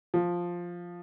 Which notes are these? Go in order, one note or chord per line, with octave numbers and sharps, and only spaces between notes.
F3